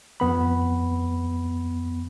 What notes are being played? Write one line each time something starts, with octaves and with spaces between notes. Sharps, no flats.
F2 B3 B5